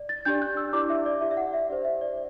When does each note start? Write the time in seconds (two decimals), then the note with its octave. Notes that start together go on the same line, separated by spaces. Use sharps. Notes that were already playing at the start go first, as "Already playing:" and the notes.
Already playing: D5
0.09 A6
0.25 D4 G4 D5 G6
0.42 F#6
0.57 E6
0.73 E4 G4 D5 D6
0.90 E5
1.06 D5
1.21 E4 G4 D5 E5
1.31 E5
1.37 F#5
1.54 E5
1.69 D4 G4 C5 D5
1.85 E5
2.01 D5